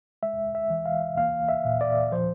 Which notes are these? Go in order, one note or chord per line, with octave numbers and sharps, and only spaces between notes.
G#3 E5
E5
E3
F5
A#3 F5
E5
A#2
D5
F3 C5